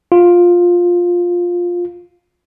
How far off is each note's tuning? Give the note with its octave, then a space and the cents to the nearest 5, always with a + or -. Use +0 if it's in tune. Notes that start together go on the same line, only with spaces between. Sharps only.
F4 +10